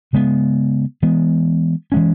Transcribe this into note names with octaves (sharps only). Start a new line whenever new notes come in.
C#3 G#3 B3
E3 G#3 B3
E3 G#3 C#4